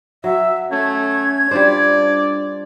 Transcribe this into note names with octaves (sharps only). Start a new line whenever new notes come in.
F#3 E5
A3 C#4 G#6
G3 D4 F4 C5 D5